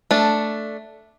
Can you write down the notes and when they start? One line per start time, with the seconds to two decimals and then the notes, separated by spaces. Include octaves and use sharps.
0.11 A3 D4